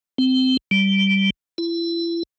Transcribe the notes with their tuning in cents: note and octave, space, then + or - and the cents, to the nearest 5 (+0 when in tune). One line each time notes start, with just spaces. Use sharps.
C4 -15
G3 -10
E4 +35